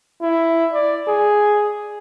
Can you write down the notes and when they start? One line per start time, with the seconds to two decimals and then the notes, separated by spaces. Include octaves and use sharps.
0.21 E4
0.73 D5
1.07 G#4